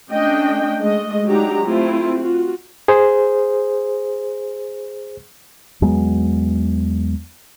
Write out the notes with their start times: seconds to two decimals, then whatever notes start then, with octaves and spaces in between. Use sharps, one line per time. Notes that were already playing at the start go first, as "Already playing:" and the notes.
0.10 A3 C#4 D4 D#5 G5
0.79 G#3 A3 D#5
1.26 F#3 G#3 D4 D#4 G4 A#5
1.64 A3 C4 E4 F4
2.19 F4 F#4
2.88 G#4 C5
5.82 E2 F#3 G#3 B3